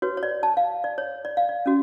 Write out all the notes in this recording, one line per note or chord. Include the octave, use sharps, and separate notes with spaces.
F#4 B4 C#5
C#5
D5
A5
F5
D5
C#5
D5
F5
D5
C#4 F#4